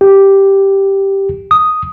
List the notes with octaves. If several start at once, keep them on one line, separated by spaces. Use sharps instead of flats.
G4
D#6